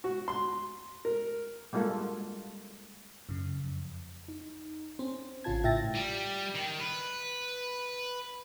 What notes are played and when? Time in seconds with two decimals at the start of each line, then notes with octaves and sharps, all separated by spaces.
0.04 F#4
0.28 C6
1.05 A#4
1.73 G3 G#3 A#3 F4 F#4 A4
3.29 F#2 C#3
3.60 F2
4.28 D#4
4.99 C4 C#4 C5
5.44 A1 C#3 C#4 F4 A5 G#6
5.63 A2 F4 E5 G5 A6 A#6
5.95 G3
6.55 D#3
6.80 B4